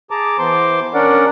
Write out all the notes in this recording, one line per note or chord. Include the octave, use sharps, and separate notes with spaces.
G#4 A5 A#5 D6
E3 B3 C5 C6 D6
C#4 D4 A#4 D5 F#5